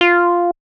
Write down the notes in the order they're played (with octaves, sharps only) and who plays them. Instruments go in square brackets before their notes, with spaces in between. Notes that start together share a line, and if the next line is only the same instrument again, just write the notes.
[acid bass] F4